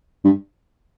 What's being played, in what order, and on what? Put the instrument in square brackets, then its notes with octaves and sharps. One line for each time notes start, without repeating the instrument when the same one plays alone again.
[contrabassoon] G2